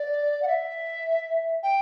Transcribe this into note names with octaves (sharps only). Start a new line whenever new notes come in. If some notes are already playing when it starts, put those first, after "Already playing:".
Already playing: D5
F#5
E5
G5